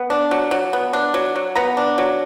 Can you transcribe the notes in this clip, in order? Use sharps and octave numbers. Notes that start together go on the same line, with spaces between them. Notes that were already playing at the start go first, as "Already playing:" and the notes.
Already playing: B3
D4
F#3
F#3
B3
D4
F#3
F#3
B3 A#5
D4
F#3